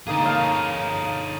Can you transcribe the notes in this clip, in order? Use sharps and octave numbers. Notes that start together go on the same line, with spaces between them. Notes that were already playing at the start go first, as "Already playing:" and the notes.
D3 A#3 D#4 G#4
C#5 F5 A5
F5